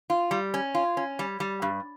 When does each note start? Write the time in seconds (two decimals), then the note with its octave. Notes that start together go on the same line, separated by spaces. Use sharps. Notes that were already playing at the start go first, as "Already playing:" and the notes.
0.10 F4
0.31 G3
0.54 C#4
0.75 F4
0.97 C#4
1.19 G3
1.40 G3
1.62 G2